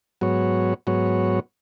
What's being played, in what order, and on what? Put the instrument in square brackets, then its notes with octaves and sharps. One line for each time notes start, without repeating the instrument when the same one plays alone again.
[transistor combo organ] G#2 F#3 B3 F#4 C#5
G#2 F#3 B3 F#4 C#5